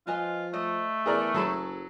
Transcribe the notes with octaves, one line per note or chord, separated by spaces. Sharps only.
F3 F4 B4 D#5 G#5
A3 D#5
E2 G#4 A#4 D5
F#1 F#3 G#4 A4 A5 B5